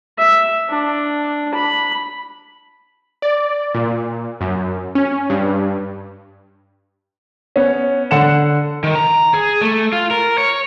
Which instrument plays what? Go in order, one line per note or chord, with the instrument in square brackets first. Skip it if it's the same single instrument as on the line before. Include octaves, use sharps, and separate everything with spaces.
[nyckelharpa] E5
D4
B5
[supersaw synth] D5
A#2
F#2
C#4
G2
[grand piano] B3 C#4
D3 F#5 C#7 E7
[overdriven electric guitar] D#3
A#5
G#4
A3
F4
A#4
C#5